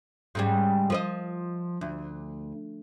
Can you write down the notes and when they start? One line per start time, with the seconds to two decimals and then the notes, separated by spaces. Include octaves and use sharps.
0.35 G#2 C#3 G3
0.90 F3 B4 D#5
1.81 D2